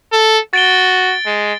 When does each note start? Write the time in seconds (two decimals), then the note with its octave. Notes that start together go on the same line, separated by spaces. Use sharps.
0.12 A4
0.53 F#4 A6 D7 G7
1.26 G#3